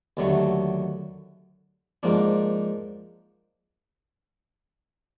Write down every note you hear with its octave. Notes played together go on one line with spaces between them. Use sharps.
D#2 D3 F#3 A3
G#2 F3 A#3 D4